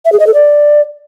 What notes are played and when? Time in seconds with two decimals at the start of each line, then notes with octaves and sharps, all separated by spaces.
0.05 E5
0.12 G#4
0.20 D#5
0.27 A4
0.34 D5